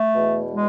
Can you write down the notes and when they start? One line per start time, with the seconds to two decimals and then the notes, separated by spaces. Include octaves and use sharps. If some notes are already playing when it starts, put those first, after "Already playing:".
Already playing: A3
0.14 E2 B2
0.52 G#3